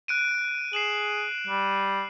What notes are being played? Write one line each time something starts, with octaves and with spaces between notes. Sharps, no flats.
F#6 D7 D#7
G#4 C7 E7 F#7
G3